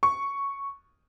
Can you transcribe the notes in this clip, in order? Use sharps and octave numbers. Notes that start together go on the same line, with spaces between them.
C#6